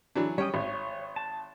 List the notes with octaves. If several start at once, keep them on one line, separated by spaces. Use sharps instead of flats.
E3 F#3 D4
G3 C#4 C#5 D#5 G5
G#1 C#5
A5